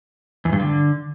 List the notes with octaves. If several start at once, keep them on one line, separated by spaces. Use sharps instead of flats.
E2
G2
D3